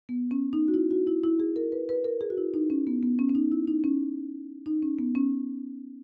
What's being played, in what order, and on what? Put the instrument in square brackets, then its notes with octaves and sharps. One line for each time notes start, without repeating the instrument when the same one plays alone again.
[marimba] B3
C#4
D#4
F#4
E4
F#4
E4
E4
G#4
A#4
B4
B4
A#4
G#4
F#4
E4
D#4
C#4
B3
B3
C#4
C#4
D#4
E4
D#4
C#4
D#4
C#4
B3
C#4